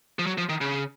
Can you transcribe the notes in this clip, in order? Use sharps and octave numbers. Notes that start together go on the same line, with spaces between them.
F3
F#3
F3
D#3
C#3